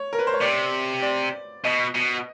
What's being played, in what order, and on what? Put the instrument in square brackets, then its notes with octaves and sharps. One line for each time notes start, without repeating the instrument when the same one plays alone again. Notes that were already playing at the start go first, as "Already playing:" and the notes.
Already playing: [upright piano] C#5
A#4
B4
C5
C#5
[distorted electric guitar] C3 [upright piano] D5
[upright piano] D5
[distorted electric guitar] B2 [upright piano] D#5
[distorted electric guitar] B2